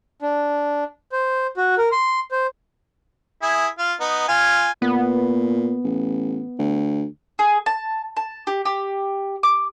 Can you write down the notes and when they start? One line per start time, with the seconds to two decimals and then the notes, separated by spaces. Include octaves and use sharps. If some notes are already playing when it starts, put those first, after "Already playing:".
0.22 D4
1.12 C5
1.57 F#4
1.78 A#4
1.92 C6
2.32 C5
3.42 E4 G#4
3.78 F4
4.00 B3 D#4
4.28 F4 G#5
4.82 A#2 B3
5.84 A1
6.59 D2
7.39 G#4
7.66 A5
8.17 A5
8.47 G4
8.65 G4
9.43 D6